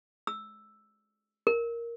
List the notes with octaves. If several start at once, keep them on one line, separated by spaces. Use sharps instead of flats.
E6
A#4